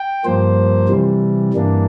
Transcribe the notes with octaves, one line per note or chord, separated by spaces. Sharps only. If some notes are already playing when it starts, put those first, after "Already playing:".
Already playing: G5
G2 F3 A#3 C5
C3 E3 G3
G2 E3 A#3 D4